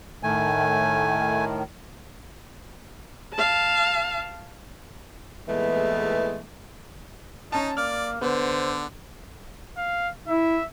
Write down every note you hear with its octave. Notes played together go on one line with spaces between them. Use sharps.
A2 D#3 A3 G#5
F5 A5
E2 A#2 E3 G#3 A3 B3
C#4 D#4 A5
A#3 D5 F6
D3 B3 C5
F5
E4 E5